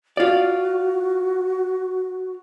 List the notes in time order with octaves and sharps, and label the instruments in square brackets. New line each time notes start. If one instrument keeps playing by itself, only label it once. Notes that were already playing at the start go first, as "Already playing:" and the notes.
[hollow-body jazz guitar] F4 D5 [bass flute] F#4